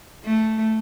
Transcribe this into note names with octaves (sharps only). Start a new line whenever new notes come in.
A3